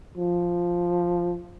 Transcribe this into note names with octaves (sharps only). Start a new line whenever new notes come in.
F3